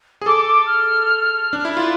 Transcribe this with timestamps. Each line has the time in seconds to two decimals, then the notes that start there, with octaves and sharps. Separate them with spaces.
0.22 G#4
0.26 A4 D6
0.47 D6
0.66 F6
1.53 D4
1.65 E4
1.77 F4